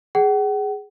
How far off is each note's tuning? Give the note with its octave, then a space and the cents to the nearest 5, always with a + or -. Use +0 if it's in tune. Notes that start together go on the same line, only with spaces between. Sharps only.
G#4 +0 F#5 +40